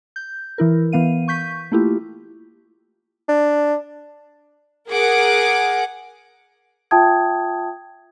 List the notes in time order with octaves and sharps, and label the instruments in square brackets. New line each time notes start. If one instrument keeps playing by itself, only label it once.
[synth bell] G6
E3 E4 A#4
E3 B3 F5 D#7
C#6 G6 B6
A3 A#3 E4 F4 G4
[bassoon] D4
[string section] G#4 A#4 F#5 D6
[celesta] F4 E5 G5 A5 D#6 G#6